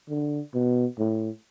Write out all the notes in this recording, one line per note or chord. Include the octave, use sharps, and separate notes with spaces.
D3
B2
A2